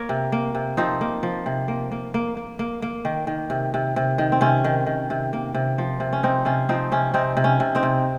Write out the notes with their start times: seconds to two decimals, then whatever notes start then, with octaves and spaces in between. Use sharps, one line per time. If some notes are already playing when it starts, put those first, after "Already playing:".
Already playing: A#3 A#4 C#5
0.09 C3
0.32 A#3
0.55 C3
0.77 F3 C4 D#4
1.01 A#3
1.23 F3
1.46 C3
1.68 A#3
1.92 A#3
2.14 A#3
2.37 A#3
2.59 A#3
2.82 A#3
3.05 D#3
3.27 D#3
3.50 C3
3.74 C3
3.96 C3
4.18 D#3
4.32 C4
4.41 C3 C#4
4.64 D#3
4.86 D#3
5.10 C3
5.33 A#3
5.54 C3
5.78 F3
6.00 C3
6.13 C#4
6.23 C3 C4 D#4
6.45 C3 C#4 F4
6.69 F3 C4 D#4
6.92 C3 C#4
7.14 C3 C4 D#4
7.37 C3
7.44 C#4
7.60 C3
7.75 C4 D#4
7.83 C3